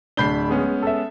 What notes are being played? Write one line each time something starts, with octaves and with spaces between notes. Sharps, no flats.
D1 D4 B5 G6 C7 G7
G#3 B3 C#4
A4 E5